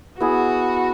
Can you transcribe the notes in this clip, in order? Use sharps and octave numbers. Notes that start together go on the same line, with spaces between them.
B3 E4 F#4 G#4